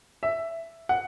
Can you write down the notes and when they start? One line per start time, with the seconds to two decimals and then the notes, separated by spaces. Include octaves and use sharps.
0.23 E5
0.89 F#5